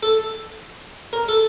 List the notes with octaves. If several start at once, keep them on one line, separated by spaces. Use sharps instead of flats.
A4
A#4
A4